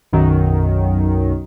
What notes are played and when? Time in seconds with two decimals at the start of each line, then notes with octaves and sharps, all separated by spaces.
0.13 B1 F#2 D#3 F#3